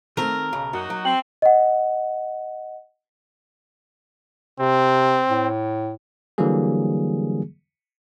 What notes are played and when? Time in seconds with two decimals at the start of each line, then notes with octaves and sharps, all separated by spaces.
0.17 D#3 A3 C4 A#4
0.53 B1 C#3
0.73 F#2 A#3 D#4 F#4
0.90 F#3
1.05 C4 G5 F#7
1.42 D#5 F#5
4.60 C3 C4
5.30 A2
6.38 D3 E3 F#3 G3 A#3 G#4